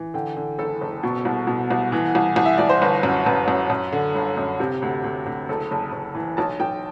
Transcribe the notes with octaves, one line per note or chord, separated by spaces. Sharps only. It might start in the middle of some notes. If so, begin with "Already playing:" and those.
Already playing: E3
D3 G5
D3
F#1 A4
F#1
B2
C2
B2
C2
E3
C2
C2
E5
C2 D5
C5
G1 B4
F#2
F#2 B4
F#2
F#2
D3
G1
F#2
C3
D2
D2
D2
F#1 A4
F#1
F#1
E3
B1 A5
B1 G5